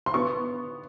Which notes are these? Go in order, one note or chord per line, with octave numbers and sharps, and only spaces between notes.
C6
B3 C#6